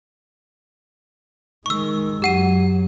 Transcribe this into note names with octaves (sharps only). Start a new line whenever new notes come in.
D#3 G#3 C#6 E6
F#2 F#3 G4 F#5 D#7